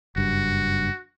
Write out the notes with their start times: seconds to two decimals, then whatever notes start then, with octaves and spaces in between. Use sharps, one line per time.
0.16 F#1 G2 F#4